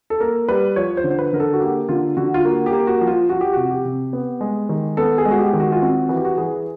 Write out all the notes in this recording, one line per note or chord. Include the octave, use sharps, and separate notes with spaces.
A4
A#3 A#4
G3 B4
F3 C#5
C5
D3
C5
B4
D3 A#4
A4
F#4
A#3 G4
D3 F4
D3 F#4
F4
A#3 F#4
G4
A#3
F#4
F3
F4
F3 F#4
G4
C3 F#4
G4
C3
B3
G#3
D#3
B3 A4
G#4
G#3
F#4
G4
D#3
F#4
F4
C4 F#4
E3 F#4
G4
F#4
E3 G#4